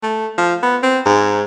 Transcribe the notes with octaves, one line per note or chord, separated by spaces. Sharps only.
A3
F3
B3
C4
G#2